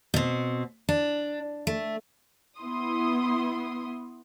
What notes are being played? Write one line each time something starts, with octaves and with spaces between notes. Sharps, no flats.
B2 C4
D4
A3
B3 E4 C6 D#6